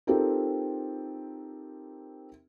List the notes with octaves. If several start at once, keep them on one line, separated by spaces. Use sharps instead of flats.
C4 D#4 F4 G4 A4 A#4